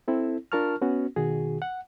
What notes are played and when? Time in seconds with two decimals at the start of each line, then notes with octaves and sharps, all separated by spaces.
0.08 C4 E4 A4
0.52 D4 F4 A#4 A5 C#6 F6
0.81 B3 C#4 F#4
1.16 B2 D#3 F#4 G#4
1.62 F#5